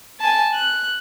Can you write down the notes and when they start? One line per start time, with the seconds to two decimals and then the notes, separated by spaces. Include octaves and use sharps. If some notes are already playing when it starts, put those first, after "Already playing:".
0.20 G#5 A5
0.54 F#6